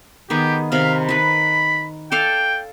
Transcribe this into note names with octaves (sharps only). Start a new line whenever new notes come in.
D#3 B3 G4 G#4
C3 D#3 F5 B5
D#3 B4 B5
A4 D5 F5 G5